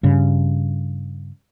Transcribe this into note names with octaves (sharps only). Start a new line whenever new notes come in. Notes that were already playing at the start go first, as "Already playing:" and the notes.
G2 C#3